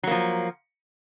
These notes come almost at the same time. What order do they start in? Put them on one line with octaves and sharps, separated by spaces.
F#3 A#3 F3